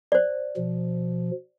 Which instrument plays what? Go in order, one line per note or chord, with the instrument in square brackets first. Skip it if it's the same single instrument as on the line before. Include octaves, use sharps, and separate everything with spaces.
[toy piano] C5 D5
[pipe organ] B2 F3